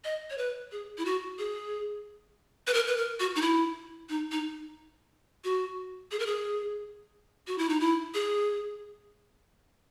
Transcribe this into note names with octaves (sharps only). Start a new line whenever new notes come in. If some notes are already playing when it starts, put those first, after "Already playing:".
D#5
C#5
B4
G#4
E4
F#4
G#4
B4
A#4
B4
A#4
F#4
D#4
E4
D#4
D#4
F#4
G#4
A#4
G#4
F#4
E4
D#4
E4
G#4